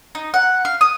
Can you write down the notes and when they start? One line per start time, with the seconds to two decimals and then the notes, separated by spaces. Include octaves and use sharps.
0.15 D#4
0.34 F#5
0.65 F5
0.81 D#6